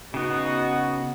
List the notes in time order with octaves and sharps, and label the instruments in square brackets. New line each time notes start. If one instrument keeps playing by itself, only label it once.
[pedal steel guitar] C#3 B3 [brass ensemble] D#4 F#4